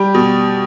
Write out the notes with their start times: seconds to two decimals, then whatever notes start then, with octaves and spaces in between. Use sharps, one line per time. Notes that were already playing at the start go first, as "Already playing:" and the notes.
Already playing: G3 G4
0.14 B2